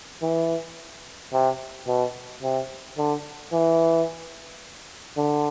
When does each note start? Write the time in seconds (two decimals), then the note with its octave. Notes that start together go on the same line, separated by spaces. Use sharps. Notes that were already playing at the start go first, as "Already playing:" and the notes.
0.22 E3
1.33 C3
1.88 B2
2.43 C3
2.98 D3
3.53 E3
5.17 D3